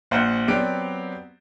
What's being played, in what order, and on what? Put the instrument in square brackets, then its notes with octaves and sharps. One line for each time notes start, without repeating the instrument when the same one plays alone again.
[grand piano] A#1 C5 F#5
F#3 B3 C4 G4 D5 D7